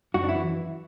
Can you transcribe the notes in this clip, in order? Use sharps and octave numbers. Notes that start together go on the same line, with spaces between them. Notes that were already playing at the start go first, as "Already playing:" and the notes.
F#2 F#4
D4
E4
E3